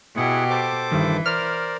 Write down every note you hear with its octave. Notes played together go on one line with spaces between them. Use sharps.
B2 E4 G4 G#4 F#5
A4 C5 D6
G1 G2 D#3 E3
A#4 C5 D5 F6